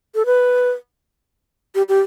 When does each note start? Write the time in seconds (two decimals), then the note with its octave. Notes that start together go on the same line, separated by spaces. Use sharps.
0.15 A4
0.26 B4
1.75 G4
1.89 G4